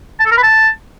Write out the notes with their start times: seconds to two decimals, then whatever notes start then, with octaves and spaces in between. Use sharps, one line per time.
0.20 A5
0.26 A4
0.31 A#4
0.37 B4
0.43 A5